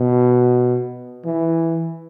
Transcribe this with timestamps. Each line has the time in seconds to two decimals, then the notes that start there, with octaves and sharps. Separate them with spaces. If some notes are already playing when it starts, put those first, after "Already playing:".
Already playing: B2
1.25 E3